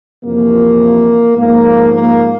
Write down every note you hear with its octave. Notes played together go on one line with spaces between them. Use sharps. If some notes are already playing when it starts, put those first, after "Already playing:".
F2 C3 E3 A#3
G#2 F3 A#3
A#3